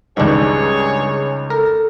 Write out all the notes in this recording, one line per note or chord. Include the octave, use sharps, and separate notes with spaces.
C#2 G2 D#3 D4 G#4 C#5
A4 A#4